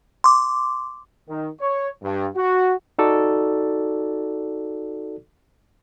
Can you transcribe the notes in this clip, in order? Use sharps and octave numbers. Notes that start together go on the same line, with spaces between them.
C6 D6
D#3
C#5
G2
F#4
D#4 F#4 A4 D5